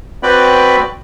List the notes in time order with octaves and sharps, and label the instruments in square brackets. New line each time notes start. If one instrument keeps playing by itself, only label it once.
[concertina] C4 F#4 B4 D5 G5 B5